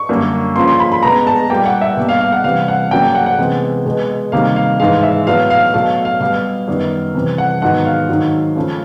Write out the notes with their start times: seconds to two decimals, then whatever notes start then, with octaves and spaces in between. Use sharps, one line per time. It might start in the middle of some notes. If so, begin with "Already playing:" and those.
Already playing: C#6
0.09 F#2 D3 G3 A#3
0.56 C#3 F3 A#3 C6
0.68 C6
0.79 B5
0.92 B5
1.03 B2 G#3 B3 A#5
1.27 A5
1.50 A#2 G3 A#3 G5
1.65 F#5
1.81 E5
1.97 B2 G3 A#3
2.09 F5
2.21 F5
2.32 F#5
2.44 C3 E3 G3 F5
2.68 F#5
2.91 C#3 F#3 A#3 G5
3.04 G5
3.15 F#5
3.26 F#5
3.38 C3 E3 G#3 B3
3.85 B2 G#3 B3
4.32 C3 D#3 G3 A#3 F5
4.56 F5
4.80 G#2 E3 G#3 F5
5.03 E5
5.27 A2 F#3 B3 F5
5.50 F5
5.74 B2 F#3 A3 F5
6.05 F5
6.20 B2 G3 B3 F5
6.68 F#2 D#3 G3 B3
7.15 C3 E3 G3
7.38 F#5
7.62 G#2 D#3 F#3 B3 F#5
7.85 F5
8.09 G#2 D#3 F#3
8.56 C#3 F3 A3